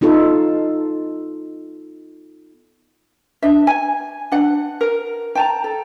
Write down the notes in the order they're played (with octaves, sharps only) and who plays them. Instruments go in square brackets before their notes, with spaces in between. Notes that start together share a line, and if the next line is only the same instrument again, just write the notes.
[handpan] B3 D#4 F4 A4
[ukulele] D4 E5
G#5
D4 F#5
A#4
G5 A5 A#5
A4